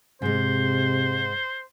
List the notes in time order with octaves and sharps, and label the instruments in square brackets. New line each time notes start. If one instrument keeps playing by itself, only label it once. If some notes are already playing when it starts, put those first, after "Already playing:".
[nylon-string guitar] G#2 G#3 [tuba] C3 [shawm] C5